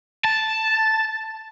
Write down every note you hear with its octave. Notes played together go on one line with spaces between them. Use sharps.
A5